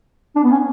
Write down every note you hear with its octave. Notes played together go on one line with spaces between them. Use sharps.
D4
B3
C#4